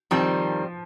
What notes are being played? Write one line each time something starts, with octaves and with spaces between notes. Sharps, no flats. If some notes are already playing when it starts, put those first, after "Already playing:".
D#3 F3 G3 C4